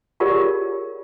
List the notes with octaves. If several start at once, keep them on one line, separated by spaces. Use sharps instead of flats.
F4 G4 G#4 A#4 C#5 D5